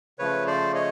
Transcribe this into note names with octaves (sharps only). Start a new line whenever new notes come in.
C#3 F3 A3 B4 C#5
C5 D5
C#5 D#5